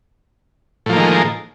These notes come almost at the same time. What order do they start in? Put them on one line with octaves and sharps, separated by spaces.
A2 F3 A#3 D#3 G#3